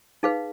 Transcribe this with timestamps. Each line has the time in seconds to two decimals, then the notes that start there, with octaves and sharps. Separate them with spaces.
0.23 D#4 G#4 B4 F5